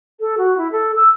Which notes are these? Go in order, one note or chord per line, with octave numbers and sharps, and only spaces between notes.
A4
F#4
E4
A4
E6